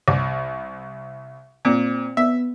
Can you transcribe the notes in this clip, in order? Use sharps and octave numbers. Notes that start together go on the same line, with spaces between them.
C2 E5
A#2 C4
B3 E5